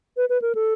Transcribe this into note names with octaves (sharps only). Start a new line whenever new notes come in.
B4
B4
A#4
A4